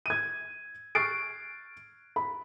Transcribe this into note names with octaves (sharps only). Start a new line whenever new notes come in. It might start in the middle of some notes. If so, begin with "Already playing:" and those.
G#6 D#7
C#6 F6 F#6 A6 C7 D7
B5